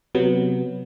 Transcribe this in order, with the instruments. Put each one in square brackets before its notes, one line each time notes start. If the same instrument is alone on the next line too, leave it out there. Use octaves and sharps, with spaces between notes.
[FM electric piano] C3 F#3 B3